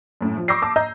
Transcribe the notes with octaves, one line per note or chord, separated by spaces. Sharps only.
F#2 A2
F3
C#6 D6 E6 G6 A#6 C7
A5 D6 E6
D#5 A#5 G6